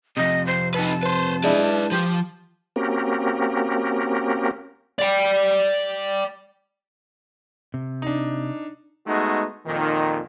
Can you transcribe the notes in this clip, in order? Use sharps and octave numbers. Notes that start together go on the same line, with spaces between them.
F2 C3 D#5
C5
D#4 B4 A5
B4 C5
G#3 D4 E4 B4 D5
F3 G4
A#3 C4 C#4 F#4 G4 A#4
D5 G5
C3
D4 D#4
G#3 A3 B3 D#4 F#4
F2 A#2 D#3